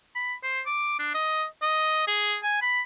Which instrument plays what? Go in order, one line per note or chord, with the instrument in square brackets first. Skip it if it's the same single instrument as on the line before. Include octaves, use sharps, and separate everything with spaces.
[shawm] B5
C5
D6
D4
D#5
D#5
G#4
G#5
B5